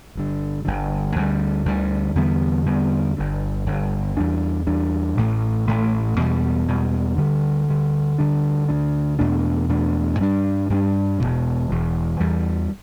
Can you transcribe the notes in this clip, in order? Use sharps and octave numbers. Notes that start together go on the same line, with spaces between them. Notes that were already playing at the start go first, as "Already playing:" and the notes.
G1 G2 D3
G1 G2 D3
D2 D3 G3
D2 D3 G3
E2 D3 G3 B3
E2 D3 G3 B3
G1 G2 D3
G1 G2 D3
E2 E3 G3 D4
E2 E3 G3 D4
A1 A2 A3
A1 A2 A3
E2 B2 G3
E2 B2 G3
D2 D3 G3
D2 D3 G3
D2 D3 G3 D4
D2 D3 G3 D4
E2 B2 A3 D4
E2 B2 A3 D4
G2 G3 B3 D4
G2 G3 B3 D4
E1 E2 B2
E1 E2 B2
E2 E3 G3